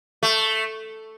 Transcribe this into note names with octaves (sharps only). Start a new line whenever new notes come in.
A3